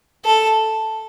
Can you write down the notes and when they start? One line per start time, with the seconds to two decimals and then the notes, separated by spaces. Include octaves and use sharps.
0.25 A4